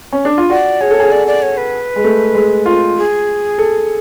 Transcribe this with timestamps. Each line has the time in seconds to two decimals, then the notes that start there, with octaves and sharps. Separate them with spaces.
0.13 C#4
0.25 D4
0.38 F4
0.50 F#4 D5
0.81 G#4 C#5
0.90 A4
1.00 G#4
1.12 A4 D5
1.27 D5
1.42 C#5
1.57 B4
1.96 G#3
2.04 A3
2.35 G#3
2.66 F4
2.97 G#4
3.58 A4